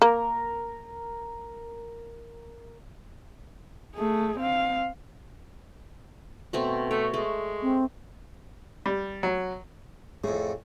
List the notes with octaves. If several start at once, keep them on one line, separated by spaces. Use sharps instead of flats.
A#3 A#4
A3 G#4
C4 F5
B2 A3 C4
A3 C#5
G#3 A3
C4
G3
F#3
F2 A2 G#4